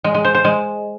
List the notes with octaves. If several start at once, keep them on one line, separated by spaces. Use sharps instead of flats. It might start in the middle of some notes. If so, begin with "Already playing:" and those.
G#3
G#3
C5
C5
G#3